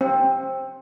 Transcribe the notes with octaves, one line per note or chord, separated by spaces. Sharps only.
C4